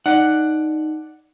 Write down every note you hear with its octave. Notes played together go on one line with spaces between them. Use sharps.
D#4 D5 F#5